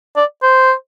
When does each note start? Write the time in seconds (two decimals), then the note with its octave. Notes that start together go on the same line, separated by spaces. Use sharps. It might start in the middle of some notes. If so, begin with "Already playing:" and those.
0.16 D5
0.42 C5